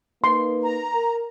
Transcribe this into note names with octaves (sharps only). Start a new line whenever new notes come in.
A#3 D#4 B4 C6
A#5
A#4